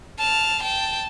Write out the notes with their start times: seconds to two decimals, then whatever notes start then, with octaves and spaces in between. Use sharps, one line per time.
0.19 A5 F6
0.63 G5 A5